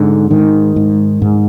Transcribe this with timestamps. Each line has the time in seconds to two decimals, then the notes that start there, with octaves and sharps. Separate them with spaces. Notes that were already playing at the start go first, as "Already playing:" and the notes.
Already playing: G#2 D3
0.31 G#2 D#3
0.76 G#2
1.22 G#2